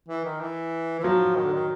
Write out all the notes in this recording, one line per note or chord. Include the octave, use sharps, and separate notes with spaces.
E3
D#3
E3
E3
F3 F#3
D#3
D3
D#3